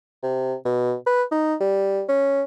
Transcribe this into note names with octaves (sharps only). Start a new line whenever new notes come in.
C3
B2
B4
D#4
G3
C#4